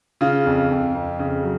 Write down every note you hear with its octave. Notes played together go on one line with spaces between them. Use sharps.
C#3 F4
F2
F2
F2
C#3
F#3